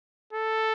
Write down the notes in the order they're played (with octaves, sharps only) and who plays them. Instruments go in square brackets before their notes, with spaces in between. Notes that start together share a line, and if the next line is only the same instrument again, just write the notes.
[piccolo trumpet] A4